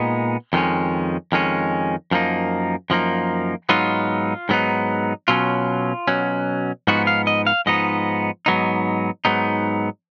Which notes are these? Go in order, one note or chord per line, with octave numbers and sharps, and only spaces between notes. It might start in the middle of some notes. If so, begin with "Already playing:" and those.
Already playing: A#2 G#3 B3 D#4
F2 D#3 G#3 C#4
F2 D#3 G#3 C#4
F#2 F3 A#3 D#4
F#2 F3 A#3 D#4
G#2 F#3 B3 D#4 F4
G#2 F#3 B3 D#4
B2 F#3 C#4 F4
B2 F#3 C#4
G#2 F3 B3 D#4 F#4
F5
D#5
F5
G#2 F3 B3 D#4 D#5
G#2 F#3 B3 D#4
G#2 F#3 B3 D#4